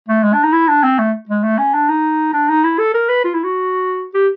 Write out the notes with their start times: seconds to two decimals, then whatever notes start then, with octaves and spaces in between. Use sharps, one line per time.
0.08 A3
0.23 G#3
0.33 D4
0.44 D#4
0.53 E4
0.68 D4
0.83 C4
0.99 A3
1.29 G#3
1.43 A3
1.58 C#4
1.74 D4
1.89 D#4
2.33 D4
2.48 D#4
2.64 E4
2.79 A4
2.94 A#4
3.09 B4
3.24 F4
3.34 E4
3.44 F#4
4.14 G4